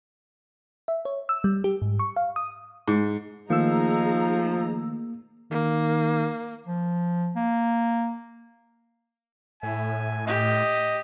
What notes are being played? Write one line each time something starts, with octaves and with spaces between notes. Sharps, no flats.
E5
C#5
E6
G3
G4
G#2
C#6
F5
D#6
G#2
D#3 F3 A3 A#3 D#4 G#4 A#5 E6
D#3 A#3
F3
A#3
A2 E5 G#5
G4 D#5